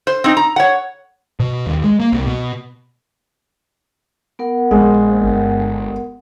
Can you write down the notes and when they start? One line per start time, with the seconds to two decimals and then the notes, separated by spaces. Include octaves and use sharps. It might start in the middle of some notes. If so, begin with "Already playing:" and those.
0.07 C5
0.24 C4 D#4
0.37 A#5
0.56 C#5 F#5
1.40 B2
1.66 D#2
1.84 G#3
2.00 A#3
2.13 C2
2.27 B2
4.39 B3 A#4 F#5
4.71 A#1 G#3
5.23 G1